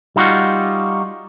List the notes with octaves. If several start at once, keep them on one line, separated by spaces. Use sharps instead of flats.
G3 D#4 F4 F#4